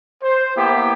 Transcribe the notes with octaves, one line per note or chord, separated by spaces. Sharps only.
C5
A#3 B3 E4 G4